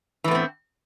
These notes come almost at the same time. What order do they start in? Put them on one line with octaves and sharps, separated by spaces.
E3 A2 B3 C4